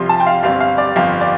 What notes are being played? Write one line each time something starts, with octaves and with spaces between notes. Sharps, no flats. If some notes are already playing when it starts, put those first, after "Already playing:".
Already playing: C2 C3 F3 C6
A5
G5
F5
G1 G2 G3 C4 F5
F5
D5
G1 F2 F3 F5
D5